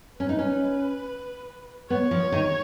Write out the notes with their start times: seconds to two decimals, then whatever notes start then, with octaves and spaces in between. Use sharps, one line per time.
0.19 C#4 B4
0.29 D#4
0.39 C#4
1.90 B3 C#5
2.11 F3
2.32 D#3